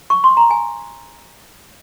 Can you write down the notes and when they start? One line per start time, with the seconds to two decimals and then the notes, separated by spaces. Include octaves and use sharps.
0.10 C#6
0.24 C6
0.37 A#5
0.51 G#5